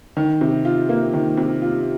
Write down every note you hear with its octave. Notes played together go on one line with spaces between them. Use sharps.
D#3
C3
F4
A#3
D#3
C3
F4